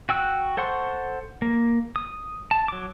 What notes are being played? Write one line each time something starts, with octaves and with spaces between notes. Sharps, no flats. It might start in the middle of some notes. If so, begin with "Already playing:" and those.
F#4 G5 E6 F#6
A4 C5 F#5 C6 C#6
A#3
D#6
A5
F#3 D6